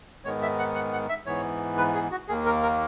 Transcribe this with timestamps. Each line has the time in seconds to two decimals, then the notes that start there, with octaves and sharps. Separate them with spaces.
0.25 G#2 D#3 G#3 B3 C#5
0.42 E5
0.59 F#5
0.75 F#5
0.93 F#5
1.09 E5
1.26 G#2 E3 B3 C#5
1.78 B4
1.95 G#4
2.11 F#4
2.28 D#2 D#3 A#3 G#4
2.45 A#4
2.62 A#4